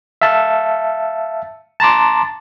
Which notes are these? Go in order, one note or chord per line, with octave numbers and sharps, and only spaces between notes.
E5 F5 A5
A5 A#5 C6 D6